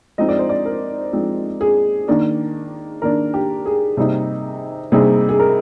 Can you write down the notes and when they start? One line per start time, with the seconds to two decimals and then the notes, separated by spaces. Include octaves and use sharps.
0.18 F3 G#3 C4 D#4 D#5
0.29 D5
0.39 C5
0.49 D5
0.65 A#4
1.13 F3 G#3 C4 D#4
1.61 G#4
2.08 D#3 A#3 D4
3.02 D#3 A#3 D4 A#4
3.34 G4
3.66 G#4
3.97 C3 G3 A#3 D#4
4.92 C3 G3 A#3 D#4 G#4
5.29 G#4
5.39 A#4